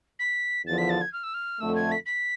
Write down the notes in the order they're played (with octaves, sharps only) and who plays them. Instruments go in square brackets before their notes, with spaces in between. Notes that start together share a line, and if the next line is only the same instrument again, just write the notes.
[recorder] B6
[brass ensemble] E2 D3 F3 [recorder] A6
[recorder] B6
A6
G#6
F6
E6
F6
[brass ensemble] F2 D3 A3 [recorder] E6
[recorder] G#6
B6
B6